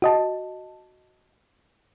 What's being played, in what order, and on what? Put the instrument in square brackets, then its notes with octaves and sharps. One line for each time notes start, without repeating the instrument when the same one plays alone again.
[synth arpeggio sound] F#4 D#5 A5